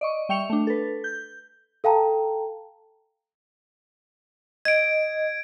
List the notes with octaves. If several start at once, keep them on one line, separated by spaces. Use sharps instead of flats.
D5 D#5 C#6
G3 E5 G5 C#6 C#7 F7
A3 D4
A4 B4
G6
A4 F5 G5 A5 A#5
D#5 G#6 D7